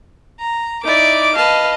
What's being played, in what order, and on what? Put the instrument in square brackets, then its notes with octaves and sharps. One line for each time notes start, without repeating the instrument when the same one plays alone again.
[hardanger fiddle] A#5
[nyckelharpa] D#4 D5 [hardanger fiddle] E4 D6
[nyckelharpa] B4 F5 [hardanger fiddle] D#5 A5